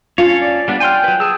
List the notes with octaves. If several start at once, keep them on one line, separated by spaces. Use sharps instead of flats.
C#4 F4 A4 C#5
D5
G3 B3 D4
G5 G#5 C6 F6
F#3 B4
G#4 G#5 A5 E6